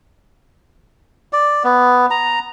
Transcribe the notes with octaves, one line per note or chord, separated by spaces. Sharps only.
D5
B3
A#5